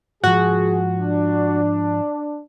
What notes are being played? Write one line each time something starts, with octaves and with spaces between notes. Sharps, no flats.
G#2 F3 F#4 G#4
D4